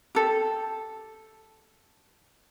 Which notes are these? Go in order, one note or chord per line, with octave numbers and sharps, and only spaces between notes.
G4 A4